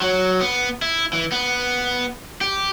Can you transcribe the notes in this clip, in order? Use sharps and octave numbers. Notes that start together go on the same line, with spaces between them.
F#3
B3
E4
E3
B3
G4